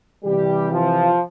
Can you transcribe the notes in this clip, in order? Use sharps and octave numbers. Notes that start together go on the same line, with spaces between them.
C3 E3 G3 G4
F3 F4